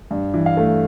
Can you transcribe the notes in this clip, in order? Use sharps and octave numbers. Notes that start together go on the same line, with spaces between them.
G2
E3
F5
A3